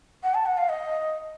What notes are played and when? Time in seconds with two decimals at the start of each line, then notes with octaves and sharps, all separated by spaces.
0.23 F#5
0.34 A5
0.46 F#5
0.57 F5
0.69 D#5